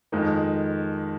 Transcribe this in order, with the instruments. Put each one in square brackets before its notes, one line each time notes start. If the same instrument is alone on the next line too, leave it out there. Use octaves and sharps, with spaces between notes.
[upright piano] F2 D#3 G#3